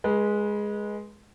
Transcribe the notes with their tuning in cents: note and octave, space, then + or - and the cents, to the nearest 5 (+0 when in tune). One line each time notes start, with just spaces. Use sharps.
G#3 +0 B4 -30